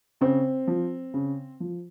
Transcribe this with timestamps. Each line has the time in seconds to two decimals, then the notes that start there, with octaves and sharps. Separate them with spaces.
0.21 C#3 C4
0.67 F3
1.14 C#3
1.60 F3